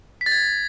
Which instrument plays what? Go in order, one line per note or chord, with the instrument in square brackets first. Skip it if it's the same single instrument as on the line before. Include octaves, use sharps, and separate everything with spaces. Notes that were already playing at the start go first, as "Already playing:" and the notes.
[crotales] B6
A6
G#6